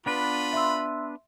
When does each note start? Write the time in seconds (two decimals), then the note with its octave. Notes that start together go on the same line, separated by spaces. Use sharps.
0.06 B3 D4 F4 B4 B5
0.53 E5 C6 E6